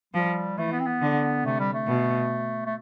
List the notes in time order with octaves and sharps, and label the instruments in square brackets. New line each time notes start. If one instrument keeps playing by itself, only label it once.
[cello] F3 [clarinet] G3
[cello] E3 [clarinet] A3
[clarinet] B3
C4
B3
[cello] D3
[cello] C3 [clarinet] A3
[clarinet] G3
A3
[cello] B2
[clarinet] A3